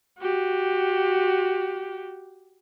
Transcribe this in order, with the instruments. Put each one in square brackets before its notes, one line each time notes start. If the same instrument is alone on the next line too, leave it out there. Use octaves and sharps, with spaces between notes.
[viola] F#4 G4